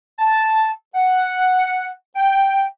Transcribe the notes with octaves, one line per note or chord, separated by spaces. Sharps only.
A5
F#5
G5